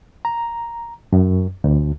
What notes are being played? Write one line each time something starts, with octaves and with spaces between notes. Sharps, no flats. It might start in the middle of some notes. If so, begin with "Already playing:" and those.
A#5
F#2
D2